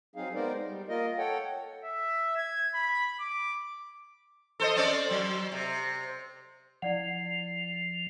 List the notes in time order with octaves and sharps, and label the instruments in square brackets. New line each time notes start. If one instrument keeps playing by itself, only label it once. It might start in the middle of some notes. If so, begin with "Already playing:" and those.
[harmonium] F#3 C4 D#4 G#4 F5
G#3 B3 D#4 A#4 C5 D5
G3
A#3 F4 A#4 D#5
A4 C#5 F#5 G5
[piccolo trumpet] E5
G#6
B5
D6
[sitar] A4 C5 D#5
C4 C#4 D5
F#3
C3
[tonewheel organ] F3 [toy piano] E4 D5 F#5